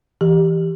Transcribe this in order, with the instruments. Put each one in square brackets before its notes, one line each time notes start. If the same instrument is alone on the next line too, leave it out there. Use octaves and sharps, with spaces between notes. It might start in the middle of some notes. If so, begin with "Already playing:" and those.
[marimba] E3 G4